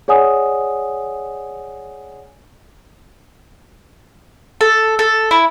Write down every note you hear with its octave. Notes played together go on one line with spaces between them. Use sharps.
G#4 C#5 D5 F#5 G#5 D#6
A4
A4
E4